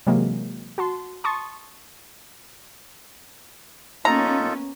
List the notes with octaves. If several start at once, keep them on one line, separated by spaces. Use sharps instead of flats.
C3 E3 F#3 G#3 A#3
F#4 A5 C6
A5 C6 C#6 D#6 A6
A#3 B3 C#4 D#4 F4 A4 A#5